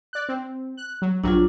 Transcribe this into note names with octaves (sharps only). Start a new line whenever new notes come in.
D5 F#6
C4
F#6
F#3
A#1 G2 F#3 D4 F4